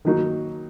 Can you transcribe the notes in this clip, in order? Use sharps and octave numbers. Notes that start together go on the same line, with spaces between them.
D#3 F#3 A#3 D#4 F#4